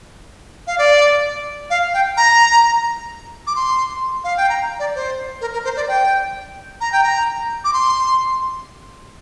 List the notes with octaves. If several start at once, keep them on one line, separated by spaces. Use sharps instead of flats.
F5
D5
F5
G5
A#5
D6
C6
F5
G5
A#5
D5
C5
A#4
A#4
C5
D5
G5
A#5
G5
A#5
D6
C6